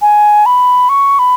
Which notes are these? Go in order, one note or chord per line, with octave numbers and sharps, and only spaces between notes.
G#5
B5
C#6
B5